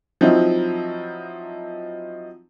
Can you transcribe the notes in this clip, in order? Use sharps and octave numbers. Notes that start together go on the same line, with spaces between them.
F3 F#3 C4 D#4 E4